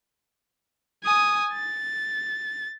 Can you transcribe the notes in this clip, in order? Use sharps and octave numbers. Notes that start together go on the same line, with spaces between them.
G#5 D#6
A6